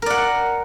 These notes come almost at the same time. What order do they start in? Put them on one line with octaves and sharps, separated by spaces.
A#4 D5 F#5